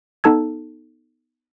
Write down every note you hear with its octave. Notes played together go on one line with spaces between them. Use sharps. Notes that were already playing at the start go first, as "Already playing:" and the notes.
B3 D#4 A4 A5 E6 G#6